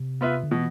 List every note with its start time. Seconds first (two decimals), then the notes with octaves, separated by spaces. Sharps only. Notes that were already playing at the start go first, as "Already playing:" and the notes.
Already playing: C3
0.21 B3 F4 B4 E5
0.43 D3
0.51 B2 E3